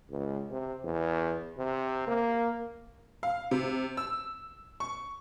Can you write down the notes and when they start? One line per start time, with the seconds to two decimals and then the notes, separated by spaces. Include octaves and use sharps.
0.11 C#2
0.51 C3
0.84 E2
1.58 C3
2.07 A#3
3.23 F5
3.51 C3
3.97 E6
4.80 C#6